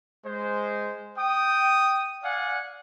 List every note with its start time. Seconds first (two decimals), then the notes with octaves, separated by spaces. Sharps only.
0.25 G#3 C5
1.18 G5 D#6
2.23 D5 F5 F#5 G#5